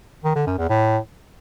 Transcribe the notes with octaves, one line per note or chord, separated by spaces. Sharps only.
D#3
D3
F#2
E2
A2